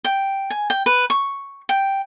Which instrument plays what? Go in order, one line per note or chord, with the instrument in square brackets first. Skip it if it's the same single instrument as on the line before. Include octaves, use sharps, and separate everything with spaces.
[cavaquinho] G5
G#5
G5
B4
C#6
G5